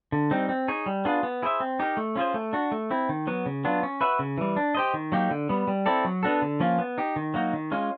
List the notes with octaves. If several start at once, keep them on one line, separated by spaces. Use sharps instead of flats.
D3
G3 C4 D#4
C4
D#4 G#4 C#5
G3
B3 D4 F4 G#4
B3
E4 G#4 C5 E5
C4
D#4 G4 A#4
A3
C#4 F4 G#4 C5
A3
D4 F#4
A3
C4 E4
D#3
F#3 B3
C#3
F#3 B3 D4 F4
C#4
F#4 B4 E5
C#3
E3 G3
D4
G4 C5 D#5
D#3
F#3 A#3 D#4 G4
D3
G3 B3
G3
C4 E4 A4 D5
F#3
B3 D4 F#4 A4
D3
F3 A#3 C#4 F4
B3
D#4 G4
D#3
F#3 A#3 D#4 F#4
D#3
G#3 C#4 F4